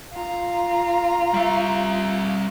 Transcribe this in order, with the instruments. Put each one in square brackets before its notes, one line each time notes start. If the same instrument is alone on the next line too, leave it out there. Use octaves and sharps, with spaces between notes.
[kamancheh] F4 A#5
[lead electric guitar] G3 E5